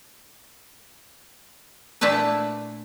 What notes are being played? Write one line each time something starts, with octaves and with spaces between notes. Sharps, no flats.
A#2 A3 D4 E4 B4